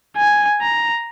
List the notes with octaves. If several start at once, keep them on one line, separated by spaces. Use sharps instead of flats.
G#5
A#5